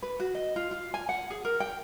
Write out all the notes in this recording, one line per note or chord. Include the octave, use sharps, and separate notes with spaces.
B4
F#4
D#5
F4
F4
G#5
F#5
G#4
A#4
G5